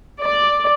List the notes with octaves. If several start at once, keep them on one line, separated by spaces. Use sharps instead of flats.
D5